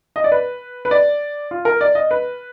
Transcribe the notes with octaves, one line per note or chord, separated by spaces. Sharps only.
D#5
D5
B4
B4
D5
F4
A#4
D5
D#5
B4